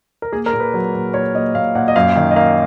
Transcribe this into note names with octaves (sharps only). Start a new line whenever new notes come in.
A#4
A#3 G#4
A#4
A#2
B4
F#3
A#2
A#2 C#5
A#2 D#5
A#2 F5
A#2 F#5
D#5
F#2 F5
D#3
D#5
A#3 F5